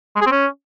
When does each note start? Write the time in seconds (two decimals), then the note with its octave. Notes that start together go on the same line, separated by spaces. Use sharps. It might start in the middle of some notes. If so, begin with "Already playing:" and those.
0.16 G#3
0.21 G#4
0.26 C4
0.31 C#4